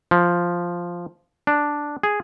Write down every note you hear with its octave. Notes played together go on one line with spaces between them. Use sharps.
F3
D4
G#4